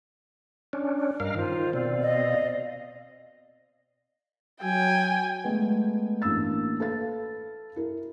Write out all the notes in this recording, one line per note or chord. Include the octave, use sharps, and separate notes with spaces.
C#4 D4
G2 A#4 D#5 F5
D#3 F4 C5
B2 C4 D5 F5
D#5
F#3 G5 G#5
G#3 A3 B3
A1 A#3 D4 E6 A6
A4 B4 F5 A6
E4 A#4